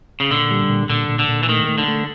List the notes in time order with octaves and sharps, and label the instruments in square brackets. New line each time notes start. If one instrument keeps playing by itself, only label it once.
[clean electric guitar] C#3
[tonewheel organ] A#2 [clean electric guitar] D3
[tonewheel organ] G3
A#2
[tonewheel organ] A#2 [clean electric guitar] D3
[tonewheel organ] A#2
[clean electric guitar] D3
[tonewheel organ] A#2
[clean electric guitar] E3
[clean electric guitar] D#3 [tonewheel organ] A3
[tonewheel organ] A3
[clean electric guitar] D3
[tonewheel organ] A3